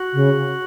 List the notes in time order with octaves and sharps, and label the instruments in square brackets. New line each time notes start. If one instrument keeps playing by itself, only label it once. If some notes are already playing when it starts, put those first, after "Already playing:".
Already playing: [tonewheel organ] F#4
[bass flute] C#3